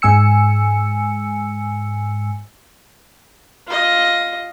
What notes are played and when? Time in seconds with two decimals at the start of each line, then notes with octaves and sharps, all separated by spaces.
0.02 G#2 G#3 G#5 E6 C#7
3.67 F4 D#5